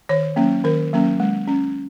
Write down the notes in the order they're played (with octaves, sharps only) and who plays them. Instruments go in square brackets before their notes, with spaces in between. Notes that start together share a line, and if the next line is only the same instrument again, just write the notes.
[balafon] D#3 C#5
F#3 A#3 C#4
D#3 A#4
F#3 A#3 C#4
G#3
C#4